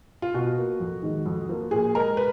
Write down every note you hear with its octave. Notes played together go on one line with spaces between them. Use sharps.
F4
B2 F#4
A#3
F2
D#3 G#3
F2
F3 A#3
A#2 G#4
G#3 A#4
B4